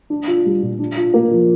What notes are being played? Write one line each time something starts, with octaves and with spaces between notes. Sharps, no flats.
D4
F4
G3
A#2
D4
F4
A#3
F3